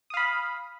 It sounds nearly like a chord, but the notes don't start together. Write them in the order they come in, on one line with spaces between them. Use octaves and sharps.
D#6 F5 B5